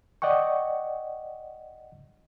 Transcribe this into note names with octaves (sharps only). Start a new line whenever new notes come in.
D5 D#5 F#5 G5 C#6